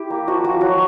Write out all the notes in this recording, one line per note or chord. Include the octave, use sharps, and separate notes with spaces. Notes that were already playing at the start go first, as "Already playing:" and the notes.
Already playing: E4 G4
A#3
F3 F#4
F3 F#4
F#3 F#4